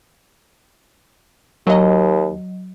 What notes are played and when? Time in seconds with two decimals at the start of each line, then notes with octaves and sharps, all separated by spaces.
1.67 D#2 F#3 D#5